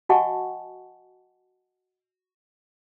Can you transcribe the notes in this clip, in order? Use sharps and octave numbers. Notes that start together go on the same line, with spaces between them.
F#4 D#5 F#5 G#5 A5 C#6